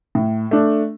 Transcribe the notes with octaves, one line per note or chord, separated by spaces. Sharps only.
A2
A3 D4